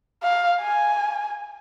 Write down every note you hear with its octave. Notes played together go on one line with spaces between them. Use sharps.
F5
G#5